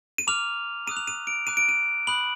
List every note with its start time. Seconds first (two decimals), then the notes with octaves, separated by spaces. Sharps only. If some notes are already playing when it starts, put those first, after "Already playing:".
0.18 D#7
0.27 A#5 D6 F6 F7
0.87 A#5 D#6 F#6 D#7
0.97 F7
1.07 D#7
1.27 D7
1.47 A#5 D6 F#6 D#7
1.57 D7
1.69 D#7
2.07 B5 D#6 F#6 F#7